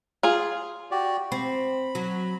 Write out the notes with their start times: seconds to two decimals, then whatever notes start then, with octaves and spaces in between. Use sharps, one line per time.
0.23 F4 G#4
0.91 F#4 G4 D5
1.32 C4 B5
1.95 F#3